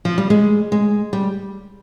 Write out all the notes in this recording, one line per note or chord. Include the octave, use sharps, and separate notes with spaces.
F3
G3
G#3
G#3
G3